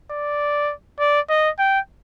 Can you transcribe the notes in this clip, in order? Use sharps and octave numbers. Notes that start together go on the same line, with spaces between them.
D5
D5
D#5
G5